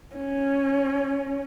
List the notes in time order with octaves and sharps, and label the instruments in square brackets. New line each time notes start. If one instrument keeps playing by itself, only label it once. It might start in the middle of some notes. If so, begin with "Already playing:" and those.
[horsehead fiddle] C#4